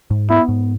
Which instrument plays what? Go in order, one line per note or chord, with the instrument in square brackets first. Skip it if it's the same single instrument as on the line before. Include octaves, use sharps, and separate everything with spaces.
[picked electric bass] G#2
[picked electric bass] B3 [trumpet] E4
[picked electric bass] G#2